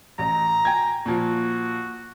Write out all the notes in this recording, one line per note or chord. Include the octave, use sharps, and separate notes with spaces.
A1 A#5
G5 G#5 G#6
A#2 F3 F#4